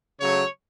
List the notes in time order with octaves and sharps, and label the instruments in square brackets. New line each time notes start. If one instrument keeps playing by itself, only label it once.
[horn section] C#3 F#3 A3 C#5